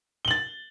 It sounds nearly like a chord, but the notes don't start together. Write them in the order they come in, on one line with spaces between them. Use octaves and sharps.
G7 F#7 A6